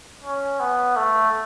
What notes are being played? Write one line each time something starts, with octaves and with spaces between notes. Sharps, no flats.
C#4
B3
A3